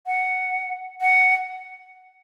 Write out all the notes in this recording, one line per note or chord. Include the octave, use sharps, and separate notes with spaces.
F#5
F#5